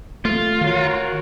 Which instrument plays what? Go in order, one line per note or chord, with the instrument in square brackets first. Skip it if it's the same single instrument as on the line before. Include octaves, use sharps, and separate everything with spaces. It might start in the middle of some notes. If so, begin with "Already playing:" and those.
[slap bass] A3 [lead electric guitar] F4
[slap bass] D#3 [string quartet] F#4 A#4 C#5